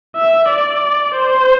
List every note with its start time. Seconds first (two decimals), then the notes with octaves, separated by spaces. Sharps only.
0.16 E5
0.48 D5
1.14 C5